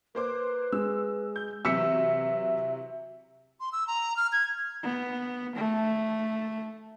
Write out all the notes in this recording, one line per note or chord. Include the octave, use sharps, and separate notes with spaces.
A#3 B4 C5 D6
G#3 E6
G6
C3 E3 F#3 E5 E6 B6 C#7
C6
E6
A#5
F6
G#6
B3
A3